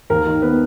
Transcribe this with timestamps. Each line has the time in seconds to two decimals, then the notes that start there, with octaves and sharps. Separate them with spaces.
0.10 D#2 A#4
0.27 D#3
0.42 B3 B4